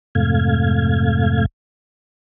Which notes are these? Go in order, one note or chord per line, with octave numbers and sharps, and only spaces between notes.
F2 G#2 C3 A3 F5 G#6